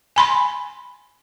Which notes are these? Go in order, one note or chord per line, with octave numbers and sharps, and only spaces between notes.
G#5 B5 C6